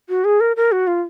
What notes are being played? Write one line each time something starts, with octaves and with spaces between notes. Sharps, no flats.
F#4
G#4
A#4
A#4
F#4
F4